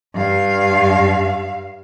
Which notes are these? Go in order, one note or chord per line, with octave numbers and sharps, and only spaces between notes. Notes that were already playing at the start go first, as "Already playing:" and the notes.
G2 F5